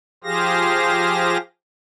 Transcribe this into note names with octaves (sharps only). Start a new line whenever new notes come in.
F3 G4 G#4 C5 F5 A#6